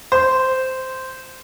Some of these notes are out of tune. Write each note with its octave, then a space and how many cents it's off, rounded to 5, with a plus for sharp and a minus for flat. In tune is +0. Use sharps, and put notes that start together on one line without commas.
C5 -10